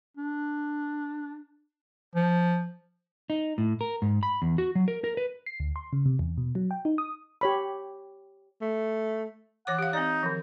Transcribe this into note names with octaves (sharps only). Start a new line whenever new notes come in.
D4
F3
D#4
A2
A#4
G#2
B5
E2
F#4
F#3
A#4
A#4
B4
C7
D2
C6
C#3
C3
E2
B2
F#3
G5
D#4
D#6
G4 C#5 B5
A3
E3 C#5 F#5 D6
G4 F5
C4 D#4 D5
D#3 F3